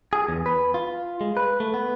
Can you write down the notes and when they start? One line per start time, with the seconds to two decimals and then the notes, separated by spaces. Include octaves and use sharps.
0.13 G#4
0.29 E2
0.46 B4
0.74 F4
1.21 G#3
1.37 B4
1.60 A3
1.74 B3